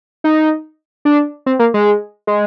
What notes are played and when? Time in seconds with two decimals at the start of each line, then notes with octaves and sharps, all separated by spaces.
0.24 D#4
1.05 D4
1.46 C4
1.59 A#3
1.74 G#3
2.27 G#3